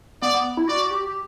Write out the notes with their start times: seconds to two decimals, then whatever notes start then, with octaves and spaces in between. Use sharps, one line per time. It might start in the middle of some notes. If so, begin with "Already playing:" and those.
0.22 B3 D5
0.35 B3
0.57 E4
0.68 F#4 D5
0.91 G4